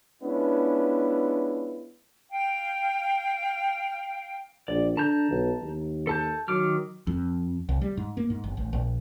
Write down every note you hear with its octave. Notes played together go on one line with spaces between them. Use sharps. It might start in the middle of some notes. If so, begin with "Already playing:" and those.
G#3 B3 C#4 D4 E4 F4
F5 G5
A#1 D5
D3 A5 A#5 G6
B1
D#2
A4 A5 G6
D#3 F#3 D6 F6
F2
C2
G3
G#2
A#3
G#2
G1
A1
A#1